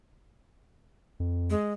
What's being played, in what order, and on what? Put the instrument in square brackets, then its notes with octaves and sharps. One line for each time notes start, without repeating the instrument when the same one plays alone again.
[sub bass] F2
[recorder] G#3